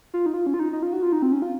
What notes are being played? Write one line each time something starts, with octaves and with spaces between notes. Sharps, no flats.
F4
D#4
F4
C#4
F4
D#4
D#4
F4
F#4
F4
D#4
C4
C#4
F4